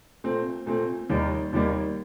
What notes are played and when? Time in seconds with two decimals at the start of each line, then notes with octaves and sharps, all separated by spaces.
0.24 A#2 A3 C4
0.66 A#2 A3 C4
1.09 D#2 D#3 G3 A#3
1.53 D#2 D#3 G3 A#3